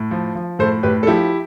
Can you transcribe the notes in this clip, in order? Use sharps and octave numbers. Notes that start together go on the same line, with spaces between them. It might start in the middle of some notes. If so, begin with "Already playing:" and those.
Already playing: A2
F3
F3
A2 A4 C5
A2 G4 B4
A4
F3 E4 G4